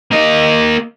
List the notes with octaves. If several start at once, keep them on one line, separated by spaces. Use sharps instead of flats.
A#3 D#5